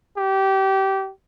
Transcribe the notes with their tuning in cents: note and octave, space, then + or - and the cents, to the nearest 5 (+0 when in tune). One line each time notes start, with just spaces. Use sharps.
G4 -20